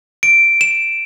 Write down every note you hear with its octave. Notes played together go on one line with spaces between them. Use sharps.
D7
E7